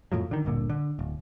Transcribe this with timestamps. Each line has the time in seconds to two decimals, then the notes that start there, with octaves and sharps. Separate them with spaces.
0.12 F2 A2 F3 F#3
0.31 D3 D#3
0.45 D1 G1 A#2 D3
0.69 D3
0.99 D1